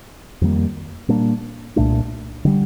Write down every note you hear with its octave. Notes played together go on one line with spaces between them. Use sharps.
F2 D#3 G3 A#3
A#2 G3 A#3 D4
C2 A#2 A3 D4
D3 G3